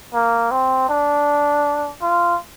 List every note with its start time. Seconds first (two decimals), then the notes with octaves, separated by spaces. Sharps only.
0.14 A#3
0.51 C4
0.89 D4
2.02 F4